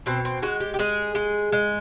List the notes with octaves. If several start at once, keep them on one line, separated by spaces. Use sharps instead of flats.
B2 C4
C4
G#3 F#4
G4
G4
G#3 G#4
G#3
G#3